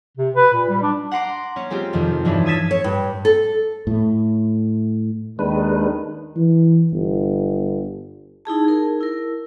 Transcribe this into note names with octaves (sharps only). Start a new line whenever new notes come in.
C3
B4
A#2
G3
D4
F#5 A#5 C6 D6
C#4
G#3 C4 F4 G4
F2 C3 D#3 F3
G2 E3 F3 C#4 D4 E4
D#6 E6 G#6 A6 B6 E7
C#5
G2
A4
A2 A3
D#2 D#3 G#3 D4 B4
E3
G1
D#4 E4 G#4 A5
G#4 A#4
E4 A#4